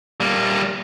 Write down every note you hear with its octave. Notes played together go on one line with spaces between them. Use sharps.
G3 A#3